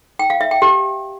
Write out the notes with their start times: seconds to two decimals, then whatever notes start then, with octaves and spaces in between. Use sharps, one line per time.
0.19 G5
0.30 F5
0.41 E5
0.51 G5
0.62 G4